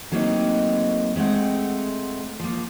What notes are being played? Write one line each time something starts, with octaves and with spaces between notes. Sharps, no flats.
F#3 A3 A#3 C4 D#4
G#3 A3 C4 F#5
F3 A#3